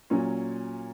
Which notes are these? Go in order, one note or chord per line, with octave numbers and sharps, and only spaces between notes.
A#2 F#3 C#4